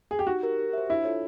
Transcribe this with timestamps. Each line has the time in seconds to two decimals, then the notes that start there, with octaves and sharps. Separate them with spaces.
0.11 G#4
0.19 G4
0.27 D#4 F#4
0.43 G4 A#4
0.58 G4
0.73 C5 E5
0.89 D4 E4
1.05 F4 A4 C#5